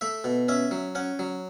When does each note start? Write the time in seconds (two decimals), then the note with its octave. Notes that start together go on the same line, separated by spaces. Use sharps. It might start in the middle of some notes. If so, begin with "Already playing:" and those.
0.01 A3 E5
0.24 B2
0.48 C#4 E5
0.71 F#3
0.95 C#4 F#5
1.19 F#3